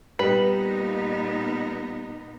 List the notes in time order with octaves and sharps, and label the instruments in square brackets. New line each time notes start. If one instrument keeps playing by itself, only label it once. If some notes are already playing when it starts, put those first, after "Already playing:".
[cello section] A#2 B3 D#4 [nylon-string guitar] G3 [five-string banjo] B4